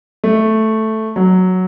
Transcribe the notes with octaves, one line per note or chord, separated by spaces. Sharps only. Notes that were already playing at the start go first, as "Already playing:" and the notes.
A3
F#3